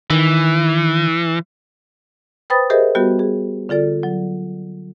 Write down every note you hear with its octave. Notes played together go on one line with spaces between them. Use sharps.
D#3 E3
B4 C5 G5 B5 D#6 A6
G4 G#4 A#4 C5 D#5 E5
G3 B3 F#4 G4
G#4
D3 F4 A4 D5
F#3